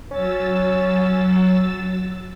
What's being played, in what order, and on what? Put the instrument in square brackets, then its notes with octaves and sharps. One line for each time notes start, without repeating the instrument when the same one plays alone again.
[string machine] F#3 E6 A6 [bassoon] C#4